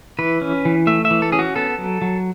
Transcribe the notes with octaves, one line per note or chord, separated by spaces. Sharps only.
E3 B4
C#4
E3
A3 E5
E5
E3
A4
C#4 G#4
F#4
B3 A4
F#3
F#3